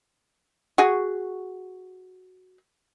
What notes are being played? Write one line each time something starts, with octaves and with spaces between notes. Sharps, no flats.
F#4 G#4